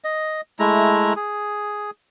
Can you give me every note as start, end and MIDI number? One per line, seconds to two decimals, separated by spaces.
0.04 0.41 75
0.59 1.13 56
0.59 1.13 57
0.59 1.13 64
0.59 1.13 82
1.16 1.91 68